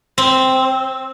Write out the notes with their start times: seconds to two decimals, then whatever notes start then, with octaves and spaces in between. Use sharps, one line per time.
0.18 C4